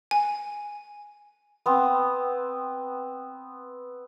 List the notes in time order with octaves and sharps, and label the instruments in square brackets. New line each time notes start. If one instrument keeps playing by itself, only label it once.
[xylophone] G#5
[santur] B3 C4